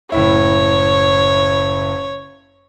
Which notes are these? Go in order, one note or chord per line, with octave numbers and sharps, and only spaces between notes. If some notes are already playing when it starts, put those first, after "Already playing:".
F#1 A2 E4 C#5